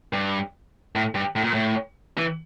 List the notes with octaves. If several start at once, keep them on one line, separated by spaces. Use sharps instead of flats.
G2
A2
G2
A2
A#2
A2
E3